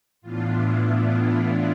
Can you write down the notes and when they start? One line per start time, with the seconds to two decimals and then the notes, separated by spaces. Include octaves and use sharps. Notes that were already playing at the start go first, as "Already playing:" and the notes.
0.21 A2 E3 B3 D4 F4
0.54 E4
0.85 F4
1.16 F4